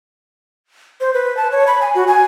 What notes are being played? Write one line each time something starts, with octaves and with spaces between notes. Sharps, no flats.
C5
B4
A5
C#5
B5
G#5
F#4
G#5